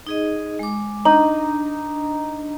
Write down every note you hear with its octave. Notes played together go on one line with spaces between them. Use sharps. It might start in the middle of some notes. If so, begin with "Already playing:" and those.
D#4 G#4 D#5
G#3 D6
D4 D#4